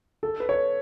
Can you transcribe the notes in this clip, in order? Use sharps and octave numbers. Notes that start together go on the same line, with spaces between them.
A4
B4
C#5